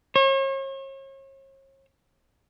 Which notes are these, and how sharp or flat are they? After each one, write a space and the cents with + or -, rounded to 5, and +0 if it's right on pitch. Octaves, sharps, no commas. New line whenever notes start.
C#5 -40